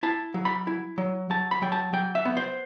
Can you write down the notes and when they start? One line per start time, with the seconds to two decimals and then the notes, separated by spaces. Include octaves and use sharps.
0.03 E4 A5
0.34 F#3
0.45 B5
0.67 E4
0.98 F#3
1.30 F#3 A5
1.51 B5
1.62 F#3 G5
1.72 A5
1.93 F#3 G5
2.15 E5
2.25 B3
2.37 C5